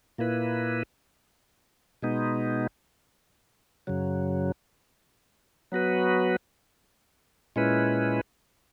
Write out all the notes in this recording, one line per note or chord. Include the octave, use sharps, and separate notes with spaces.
A#2 A#3 E4 B4
B2 G#3 B3 D#4
F#2 C#3 F#3
F#3 B3 F#4 B4
A#2 G#3 C#4 E4 B4